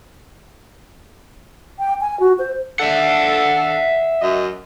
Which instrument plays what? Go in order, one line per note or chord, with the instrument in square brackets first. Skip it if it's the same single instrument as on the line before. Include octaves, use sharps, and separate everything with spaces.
[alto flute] G5
G#5
F#4
C5
[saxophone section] D4 A4 [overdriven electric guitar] E5 F#5
[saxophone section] F#2 D#5